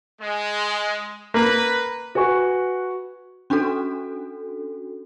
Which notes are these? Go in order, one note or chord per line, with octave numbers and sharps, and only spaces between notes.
G#3
A#3 B4
F#4 B4 G#5 C#6
C#4 D4 F#4 A4